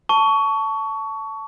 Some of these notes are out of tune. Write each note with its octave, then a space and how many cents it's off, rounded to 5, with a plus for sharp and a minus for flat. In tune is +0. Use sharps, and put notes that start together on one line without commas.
A5 +5 C#6 +20